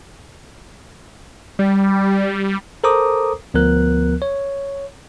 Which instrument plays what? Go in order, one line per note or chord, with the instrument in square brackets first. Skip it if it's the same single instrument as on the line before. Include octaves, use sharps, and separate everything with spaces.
[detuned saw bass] G3
[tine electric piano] A4 A#4 C5 A#5 D6 D#6
D2 F3 B3 A#4 F#6
C#5